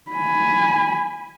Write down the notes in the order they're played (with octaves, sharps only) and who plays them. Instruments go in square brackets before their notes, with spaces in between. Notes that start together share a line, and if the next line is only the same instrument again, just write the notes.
[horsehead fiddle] G#5 B5